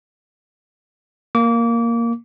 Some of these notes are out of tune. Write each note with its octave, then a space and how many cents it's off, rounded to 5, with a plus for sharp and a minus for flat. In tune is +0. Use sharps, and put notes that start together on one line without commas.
A#3 +0 D6 -30